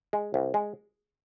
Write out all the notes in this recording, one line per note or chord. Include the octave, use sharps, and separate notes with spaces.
G#3
C2
G#3